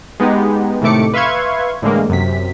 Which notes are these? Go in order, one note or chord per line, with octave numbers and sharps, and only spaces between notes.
G#3 B3 D#4 G4
A2 C3 D#3 A3 D6 C#7
B4 E5 F5 C6 C#6 G#6
A2 D3 E3 G#3 A#3
F#2 C3 B6